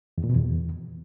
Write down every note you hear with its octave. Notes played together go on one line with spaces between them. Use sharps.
E2
A#2
B2
E2